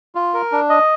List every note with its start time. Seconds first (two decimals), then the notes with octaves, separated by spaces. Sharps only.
0.15 F4
0.34 A#4
0.52 D4
0.70 D#5